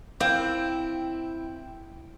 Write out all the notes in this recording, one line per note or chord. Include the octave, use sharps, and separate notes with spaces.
C4 E4 A#4 F5 G5